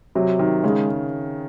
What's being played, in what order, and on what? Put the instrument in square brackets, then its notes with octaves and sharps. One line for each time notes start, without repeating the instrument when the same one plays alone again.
[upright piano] C3 [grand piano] F#3
[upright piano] D#3
[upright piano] C#3 [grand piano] G#3